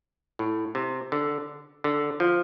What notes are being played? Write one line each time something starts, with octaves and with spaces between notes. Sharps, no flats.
A2
C3
D3
D3
F3